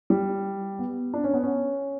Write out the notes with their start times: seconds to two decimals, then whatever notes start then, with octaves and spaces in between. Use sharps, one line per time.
0.10 G3
0.79 B3
1.14 D4
1.24 C#4
1.34 B3
1.43 C#4